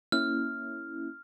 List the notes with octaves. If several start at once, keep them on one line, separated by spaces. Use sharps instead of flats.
A#3 C#4 E4 F6